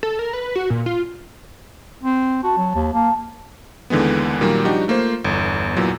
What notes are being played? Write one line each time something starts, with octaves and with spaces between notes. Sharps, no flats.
A4
A#4
B4
F#4
A#2
F4
C4
F#4 A5
F#3
D#2
A#3 A5
D#2 D3 E3 G#3 B3
A#2 D#3 F#3 G3 A#3
F3 G3 D4 D#4 F#4 G4
A3 A#3 F4 C5
G1 E2
E2 A#2 E3 F#3